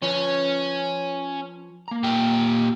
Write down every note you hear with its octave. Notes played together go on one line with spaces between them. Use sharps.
F3 C#4 B4
A#3 A#5
A#2 G4